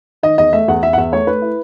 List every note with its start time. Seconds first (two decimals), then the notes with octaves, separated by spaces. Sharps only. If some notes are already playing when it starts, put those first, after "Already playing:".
0.23 D#3 D#5
0.38 E2 D#5
0.53 A3 E5
0.68 E2 F#5
0.82 E2 E5
0.93 F#5
0.97 E2 E5
1.12 A3 C#5
1.27 A3 B4
1.42 E4